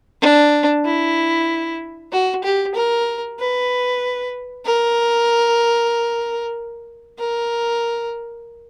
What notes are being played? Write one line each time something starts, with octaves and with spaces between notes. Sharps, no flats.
D4
E4
F#4
G4
A#4
B4
A#4
A#4